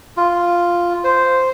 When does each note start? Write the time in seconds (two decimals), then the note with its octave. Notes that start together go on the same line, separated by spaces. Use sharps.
0.17 F4
1.04 C5